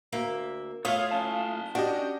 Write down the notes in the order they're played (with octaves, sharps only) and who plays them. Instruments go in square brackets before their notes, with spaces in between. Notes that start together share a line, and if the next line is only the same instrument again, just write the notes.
[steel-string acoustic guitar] D2 A#3 E5
[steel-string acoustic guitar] A3 F4 [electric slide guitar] C#5 [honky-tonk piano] F5 D#6
[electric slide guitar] C#4 A5
[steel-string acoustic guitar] D4 [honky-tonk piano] F#4 G4 D#5